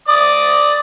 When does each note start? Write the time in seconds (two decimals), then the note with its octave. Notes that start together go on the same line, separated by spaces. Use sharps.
0.08 D5 D#6